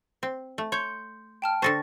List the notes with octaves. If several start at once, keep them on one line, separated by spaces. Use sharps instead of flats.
C4
A3
C#5 C6 G6 C#7
G5 A5 F6
D3 A4 C5 C#6 A6 A#6